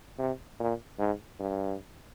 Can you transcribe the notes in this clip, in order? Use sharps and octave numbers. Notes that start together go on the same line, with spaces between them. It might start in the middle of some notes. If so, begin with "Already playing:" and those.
C3
A#2
G#2
G2